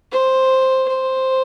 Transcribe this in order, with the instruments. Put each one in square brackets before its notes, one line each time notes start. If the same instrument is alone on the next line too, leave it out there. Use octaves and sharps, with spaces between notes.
[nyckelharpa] C5
C5